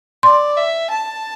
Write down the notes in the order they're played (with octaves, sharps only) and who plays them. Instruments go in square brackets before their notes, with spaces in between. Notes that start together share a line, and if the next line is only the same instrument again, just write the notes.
[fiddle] D5 [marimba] C6
[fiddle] E5
A5